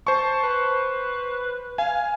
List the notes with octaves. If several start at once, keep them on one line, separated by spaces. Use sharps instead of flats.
C5 A5 C#6
B4
F5 G#5